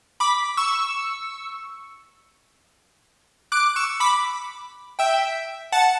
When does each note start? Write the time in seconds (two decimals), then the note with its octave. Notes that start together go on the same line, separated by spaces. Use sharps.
0.20 B5 D6
0.57 C#6 E6
3.52 D6 F#6
3.76 C#6 E6
4.00 B5 D6
4.99 E5 G5
5.72 F#5 A5